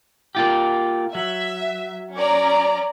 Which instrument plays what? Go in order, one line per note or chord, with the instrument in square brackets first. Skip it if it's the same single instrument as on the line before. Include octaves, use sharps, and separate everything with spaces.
[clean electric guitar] A#3 F4 G4
[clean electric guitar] F#3 [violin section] E5
[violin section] C#4 D5 A#5